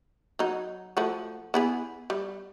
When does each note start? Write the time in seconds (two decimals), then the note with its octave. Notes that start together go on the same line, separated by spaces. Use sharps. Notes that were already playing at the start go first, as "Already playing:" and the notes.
0.39 F#3 D#4
0.97 F3 A3 F#4
1.54 B3 E4 G#4
2.10 G3